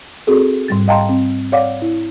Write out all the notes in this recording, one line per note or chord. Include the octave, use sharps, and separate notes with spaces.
C4 F#4 G#4 A4
G#2 G3 A6
D#5 F5 G5 A5 A#5 C6
C4
C#5 D5 F5 F#5 D6
E4